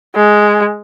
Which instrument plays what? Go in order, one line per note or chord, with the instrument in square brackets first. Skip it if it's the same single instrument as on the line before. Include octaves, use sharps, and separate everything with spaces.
[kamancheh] G#3